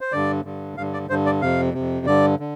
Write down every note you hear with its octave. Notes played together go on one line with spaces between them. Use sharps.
C5
G2 D3 D5
G2 D3
G2 D3 F5
D5
G2 D3 C5
D5
F2 C3 F5
F2 C3
G2 D3 D5
D3